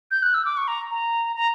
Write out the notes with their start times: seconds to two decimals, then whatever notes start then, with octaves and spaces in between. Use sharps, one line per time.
0.11 G6
0.23 F#6
0.34 E6
0.45 D6
0.57 C#6
0.68 A#5
0.91 A#5
1.36 A#5